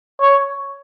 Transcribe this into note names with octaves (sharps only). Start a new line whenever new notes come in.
C#5